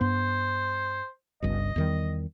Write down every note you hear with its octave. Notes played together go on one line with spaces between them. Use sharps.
G2 B3 C5
G1 C#2 G2 D#5
E2 D#3 G3